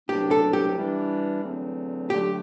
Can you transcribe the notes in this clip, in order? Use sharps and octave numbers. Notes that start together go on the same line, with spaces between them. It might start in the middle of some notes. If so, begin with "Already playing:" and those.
C2 B2 F#3 A3 D4 G4
A4
G4
E3 G3 D4
E2 D3 F#3 A3 C4
D3 F#3 A3 G4